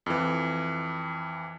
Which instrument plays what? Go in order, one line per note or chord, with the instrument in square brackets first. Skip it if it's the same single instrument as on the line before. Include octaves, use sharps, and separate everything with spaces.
[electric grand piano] F2 E3